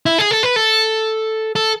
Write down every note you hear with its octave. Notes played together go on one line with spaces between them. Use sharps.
E4
G#4
A4
B4
A4
A4